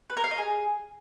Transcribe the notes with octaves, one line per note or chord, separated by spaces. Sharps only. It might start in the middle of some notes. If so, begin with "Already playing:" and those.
B4
A#4
F5
D#5
G#4